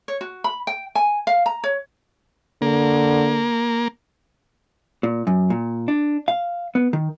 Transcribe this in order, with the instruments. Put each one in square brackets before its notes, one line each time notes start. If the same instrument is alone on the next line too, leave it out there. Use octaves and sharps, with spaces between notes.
[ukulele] C#5
F#4
B5
G5
G#5
F5
A#5
C#5
[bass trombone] D3 [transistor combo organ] A#3
[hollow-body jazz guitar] A#2
F#2
A#2
D4
F5
B3
D#3